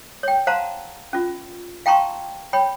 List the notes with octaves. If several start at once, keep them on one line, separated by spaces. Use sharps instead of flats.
C#5 G5
C5 F5 F#5 A5 A#5 C6
C#4 F4
F5 G5 A5 A#5 C6 C#6
C#5 G5 B5